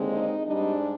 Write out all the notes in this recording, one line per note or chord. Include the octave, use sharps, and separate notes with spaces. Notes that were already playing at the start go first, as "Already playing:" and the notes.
Already playing: D#2 D3 G#3 C4
D#4
G#2 G3 D4 D#4